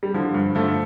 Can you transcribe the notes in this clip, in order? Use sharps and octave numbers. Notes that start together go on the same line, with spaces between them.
G3
D3 F3
G2
D3 F3 A3